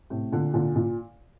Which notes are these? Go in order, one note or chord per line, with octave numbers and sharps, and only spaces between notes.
A2 C3
A#2 D3
A#2 D3
A#2